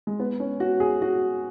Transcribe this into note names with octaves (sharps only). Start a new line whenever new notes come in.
G#3
B3
C#4
F#4
G#4
F#4